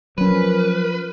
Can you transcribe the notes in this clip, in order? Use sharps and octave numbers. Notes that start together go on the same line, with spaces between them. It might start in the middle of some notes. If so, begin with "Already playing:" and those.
F3 F#3 C#4 A#4 B4